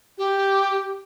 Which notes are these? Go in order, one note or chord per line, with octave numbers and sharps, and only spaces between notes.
G4